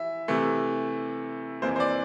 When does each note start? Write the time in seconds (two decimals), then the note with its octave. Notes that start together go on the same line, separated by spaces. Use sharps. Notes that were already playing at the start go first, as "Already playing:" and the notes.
Already playing: E3 E5
0.28 C3 E3 A3
1.62 F2 C3 E3 A#3 C5
1.76 C5
1.80 D5